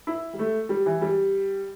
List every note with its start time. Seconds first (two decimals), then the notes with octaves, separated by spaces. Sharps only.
0.07 E4
0.33 G3
0.39 A3
0.69 G3
0.86 E3
1.01 G3